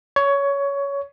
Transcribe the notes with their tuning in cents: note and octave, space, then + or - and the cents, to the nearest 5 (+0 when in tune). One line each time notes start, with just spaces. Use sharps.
C#5 +15